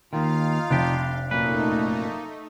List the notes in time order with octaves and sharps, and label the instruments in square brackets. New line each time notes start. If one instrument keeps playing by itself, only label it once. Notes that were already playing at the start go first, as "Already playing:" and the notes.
[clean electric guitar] D#2 D#3 [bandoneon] D#4 F4 [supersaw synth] F5
[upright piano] F1 [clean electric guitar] D4 G4
[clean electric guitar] F#2 A#2 B4 [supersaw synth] A3 D#4 [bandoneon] A#3